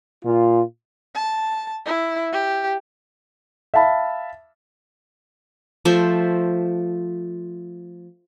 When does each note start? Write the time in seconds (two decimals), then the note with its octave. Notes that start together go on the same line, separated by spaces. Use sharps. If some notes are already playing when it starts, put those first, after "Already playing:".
0.25 A#2 F4
1.15 A5
1.86 E4
2.33 G4
3.74 E5 F5 A5 B5
5.85 F3 A3 C5 E5